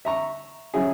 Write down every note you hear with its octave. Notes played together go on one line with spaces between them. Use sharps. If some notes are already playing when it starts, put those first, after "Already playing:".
E5 A#5 C#6
F#3 C#4 E4 G#4